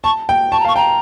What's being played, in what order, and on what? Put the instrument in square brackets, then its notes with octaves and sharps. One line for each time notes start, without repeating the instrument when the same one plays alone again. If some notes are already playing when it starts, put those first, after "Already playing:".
[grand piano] A5 [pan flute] C#6
[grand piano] G5
[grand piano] A5 [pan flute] C#6
[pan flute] A#5
[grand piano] F5 [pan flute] C#6
[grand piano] G5 [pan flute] A#5